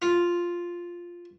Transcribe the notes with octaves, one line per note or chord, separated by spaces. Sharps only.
F4